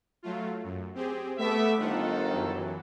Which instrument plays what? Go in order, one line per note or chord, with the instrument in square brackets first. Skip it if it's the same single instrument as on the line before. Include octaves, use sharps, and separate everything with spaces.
[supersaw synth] F#3 A3 F4
F#2
C4 G4 G#4
[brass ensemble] A3 B3 E5 [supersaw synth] D6 B6
[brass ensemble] G1 D#3 A4 [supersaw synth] D#4 F4 F#5
[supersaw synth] F#2 E3 F#3